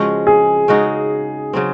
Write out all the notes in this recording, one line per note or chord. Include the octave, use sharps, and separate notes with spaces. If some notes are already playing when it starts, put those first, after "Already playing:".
Already playing: C#3 F3 G#3 C#4 F#4
G#4
C#3 G#3 D#4 F#4
C#3 F#3 C4